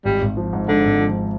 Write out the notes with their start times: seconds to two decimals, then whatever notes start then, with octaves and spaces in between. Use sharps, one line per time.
0.05 G#1 G3
0.22 G#1
0.37 F3
0.53 G#2
0.68 G#2 D3
0.85 G#1
1.01 F3